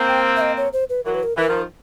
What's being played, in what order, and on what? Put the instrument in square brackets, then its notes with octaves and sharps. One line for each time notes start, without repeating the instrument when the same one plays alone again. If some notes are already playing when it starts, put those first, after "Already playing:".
Already playing: [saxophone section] A#3 C4
[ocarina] G5
E5
D#5
C#5
C5
B4
[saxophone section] E3 F#3 [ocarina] A#4
[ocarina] B4
A#4
[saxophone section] E3 [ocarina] A#4
[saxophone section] D#3 F3